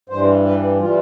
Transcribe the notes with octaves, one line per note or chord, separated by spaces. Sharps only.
G2 E3 G3 C5
B4
E3 G3 F4